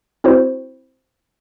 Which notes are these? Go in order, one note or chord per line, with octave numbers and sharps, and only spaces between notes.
C4 E4 F#4 C5